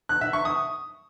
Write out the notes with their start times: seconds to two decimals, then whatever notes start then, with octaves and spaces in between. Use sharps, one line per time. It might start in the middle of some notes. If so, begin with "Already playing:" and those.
0.09 F#6
0.21 E5
0.33 C#6
0.45 D#6